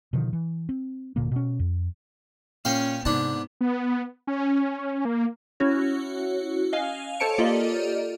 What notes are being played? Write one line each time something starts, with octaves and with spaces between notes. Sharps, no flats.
B2 D3 D#3 F3
E3
C4
D1 A#2 D3 A#3
B2 C#4
F2
A#2 C#4 F5 G5
G#2 C3 B3 D4 A5
B3
C#4
A#3
C#4 E4 F#4 C#5
D#5 F5 G#5
A4 C5 C#5 A5 C#7 D7
A#3 F4 G4 A4 D5 D#5